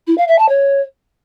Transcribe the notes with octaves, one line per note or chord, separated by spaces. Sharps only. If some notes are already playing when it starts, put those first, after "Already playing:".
E4
F5
E5
A5
C#5